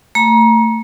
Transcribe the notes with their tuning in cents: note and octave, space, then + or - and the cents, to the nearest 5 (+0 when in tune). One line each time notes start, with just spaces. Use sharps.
A3 +25 A#5 +30